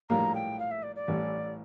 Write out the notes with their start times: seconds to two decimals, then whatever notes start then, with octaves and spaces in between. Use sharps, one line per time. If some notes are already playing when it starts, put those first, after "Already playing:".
0.10 A#1 A2 G3 A#3 A#5
0.34 G5
0.59 F5
0.71 E5
0.83 D5
0.96 D5
1.08 A1 A2 E3 G3